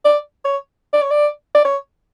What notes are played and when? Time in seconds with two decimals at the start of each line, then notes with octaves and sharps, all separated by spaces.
0.05 D5
0.45 C#5
0.93 D5
1.02 C#5
1.11 D5
1.55 D5
1.65 C#5